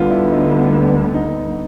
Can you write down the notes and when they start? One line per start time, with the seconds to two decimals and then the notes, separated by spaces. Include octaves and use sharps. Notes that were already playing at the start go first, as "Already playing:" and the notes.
Already playing: D2 D3 G3 B3 F4
0.10 E4
0.31 D#4
1.14 D#4